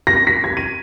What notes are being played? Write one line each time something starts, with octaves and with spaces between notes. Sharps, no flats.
A#6
B6
G#6
D#7